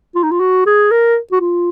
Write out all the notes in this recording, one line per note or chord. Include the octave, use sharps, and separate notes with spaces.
F4
D#4
F4
F#4
G#4
A#4
F#4
F4